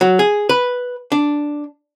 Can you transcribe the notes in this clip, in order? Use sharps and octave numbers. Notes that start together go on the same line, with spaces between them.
F#3
G#4
B4
D4